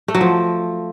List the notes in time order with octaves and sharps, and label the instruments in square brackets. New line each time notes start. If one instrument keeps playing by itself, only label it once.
[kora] A3
F#3
F3